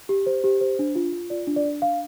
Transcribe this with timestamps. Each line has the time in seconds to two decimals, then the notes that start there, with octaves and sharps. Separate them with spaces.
0.09 G4
0.26 C5
0.44 G4
0.61 C5
0.79 D4
0.95 F4
1.13 F4
1.30 F4 D5
1.47 D4
1.56 D5
1.65 D4
1.82 D4 F5